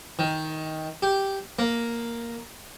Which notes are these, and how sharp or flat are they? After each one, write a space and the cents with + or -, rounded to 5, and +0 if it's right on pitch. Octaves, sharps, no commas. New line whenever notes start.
D#3 +15
G4 -5
A#3 +0